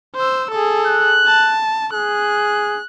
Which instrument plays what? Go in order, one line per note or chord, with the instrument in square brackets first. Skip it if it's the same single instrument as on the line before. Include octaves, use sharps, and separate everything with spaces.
[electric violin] C5 E6
G#4 A4
[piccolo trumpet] F#6
[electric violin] A5
[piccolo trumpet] G#4 [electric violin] F#6